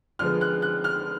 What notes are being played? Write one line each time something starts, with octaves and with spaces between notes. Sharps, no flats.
D3 F3 G#3 B3 F6
F#6
F#6
F6